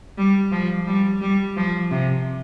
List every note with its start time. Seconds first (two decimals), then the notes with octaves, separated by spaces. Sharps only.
0.18 G3
0.52 F3
0.87 G3
1.21 G3
1.57 F3
1.91 C3